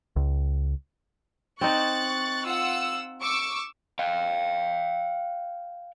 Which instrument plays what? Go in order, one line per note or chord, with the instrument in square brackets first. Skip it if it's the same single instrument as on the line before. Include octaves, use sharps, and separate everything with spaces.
[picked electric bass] C#2
[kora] C4 D#4 [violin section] C#6 F#6 A6
[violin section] F4 F#5 E6
C#6 D6 E6
[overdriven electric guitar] F5 G5